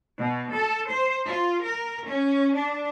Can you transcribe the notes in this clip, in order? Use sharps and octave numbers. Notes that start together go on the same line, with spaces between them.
B2
A4
C5
F4
A#4
C#4
D4